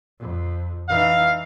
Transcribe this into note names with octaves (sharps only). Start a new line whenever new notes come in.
F2
E3 D#4 F5